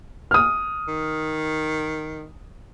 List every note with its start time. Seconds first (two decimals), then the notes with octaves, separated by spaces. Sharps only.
0.31 D#6 F6
0.88 D#3